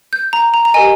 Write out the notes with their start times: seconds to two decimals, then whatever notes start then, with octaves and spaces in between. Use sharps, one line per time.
0.13 G6
0.33 A#5
0.54 A#5
0.65 A#5
0.74 G4 A#4 D#5 G#5